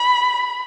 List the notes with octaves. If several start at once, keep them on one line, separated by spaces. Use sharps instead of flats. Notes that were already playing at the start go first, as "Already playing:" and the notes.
Already playing: B5